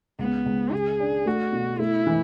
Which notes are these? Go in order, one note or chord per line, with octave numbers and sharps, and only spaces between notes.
C#2 B3
C#2
C#3 G#4
D4
A3 F#4
B2
A3 E4
E3